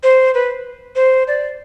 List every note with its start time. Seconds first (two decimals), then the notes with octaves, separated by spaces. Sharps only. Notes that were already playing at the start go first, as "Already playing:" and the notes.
0.03 C5
0.35 B4
0.96 C5
1.28 D5